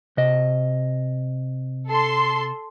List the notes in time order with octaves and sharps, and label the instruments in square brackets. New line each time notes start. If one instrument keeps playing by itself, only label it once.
[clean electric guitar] C3 D#5
[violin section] A4 C6